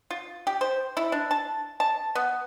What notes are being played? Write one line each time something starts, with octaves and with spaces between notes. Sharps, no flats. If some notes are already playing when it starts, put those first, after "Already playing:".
F4
G4
C5
E4
D4
A5
A5
B3